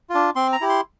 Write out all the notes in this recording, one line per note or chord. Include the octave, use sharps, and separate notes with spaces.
D4 F4
C4 C6
A#5
E4 G4
C6